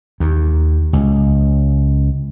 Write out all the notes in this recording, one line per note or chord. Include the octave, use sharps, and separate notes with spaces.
D#2
C#2